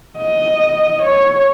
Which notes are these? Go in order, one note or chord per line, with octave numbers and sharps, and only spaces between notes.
D#5
C#5